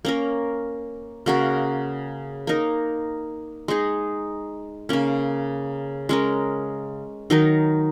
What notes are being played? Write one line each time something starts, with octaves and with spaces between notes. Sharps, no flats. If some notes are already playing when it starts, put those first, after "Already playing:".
A#3 C#4 A#4
C#3 A#3 F#4 A#4
A#3 D#4 A#4
G#3 D#4 G#4
C#3 A#3 C#4
G#3 C#4 A#4
D#3 F#3 D#4 A#4